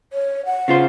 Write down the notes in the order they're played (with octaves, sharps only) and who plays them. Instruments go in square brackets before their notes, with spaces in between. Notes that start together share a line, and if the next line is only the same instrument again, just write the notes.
[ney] C#5
F#5
[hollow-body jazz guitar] C#3 F4 C5